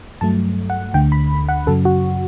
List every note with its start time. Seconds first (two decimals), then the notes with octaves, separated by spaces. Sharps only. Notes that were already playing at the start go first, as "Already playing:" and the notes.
0.21 G2 F#3 A3 A5
0.70 F#5
0.94 D2 D3 A3 G5
1.12 B5
1.49 F#5
1.67 F#2 C#3 F#3 A4
1.85 F#4